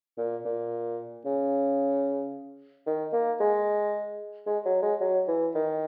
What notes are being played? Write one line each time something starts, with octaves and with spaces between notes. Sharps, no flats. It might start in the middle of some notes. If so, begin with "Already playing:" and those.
A#2
A#2
C#3
D#3
A#3
G#3
G#3
F#3
G#3
F#3
E3
D#3